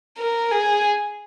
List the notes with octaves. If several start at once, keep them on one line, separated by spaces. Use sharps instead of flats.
A#4
G#4